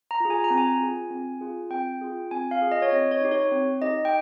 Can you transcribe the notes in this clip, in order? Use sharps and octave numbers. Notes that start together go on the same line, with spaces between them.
A#5
F4 G#4
G#5
A#5
C4
G#5
F4 G#4
C4
F4 G#4
C4 G5
F4 G#4
C4 G#5
F5
F4 G#4
D#5
C#5
C4 D#5
C#5
D#4 G4
C#5
C4
D#4 G4 D#5
G5